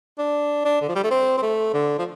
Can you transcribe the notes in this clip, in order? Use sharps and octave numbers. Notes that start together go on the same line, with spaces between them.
D4
D4
D3
F3
G3
A3
C4
C4
A3
D3
F3